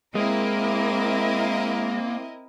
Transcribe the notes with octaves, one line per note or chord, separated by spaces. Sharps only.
G#3 A#3 C4 E4 A#4 D#5